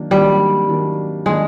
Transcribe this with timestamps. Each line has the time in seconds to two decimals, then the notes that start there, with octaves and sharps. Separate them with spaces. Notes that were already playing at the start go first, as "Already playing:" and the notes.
Already playing: D#3 F#3 A#3 D4
0.11 D#3 F#3 G3 A#3 D4
0.69 D#3 F#3 A#3 D4
1.26 D#3 F#3 G#3 A#3 D4